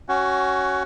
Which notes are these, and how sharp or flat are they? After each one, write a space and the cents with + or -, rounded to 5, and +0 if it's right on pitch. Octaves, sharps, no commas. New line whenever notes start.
C#4 +0 F#4 +20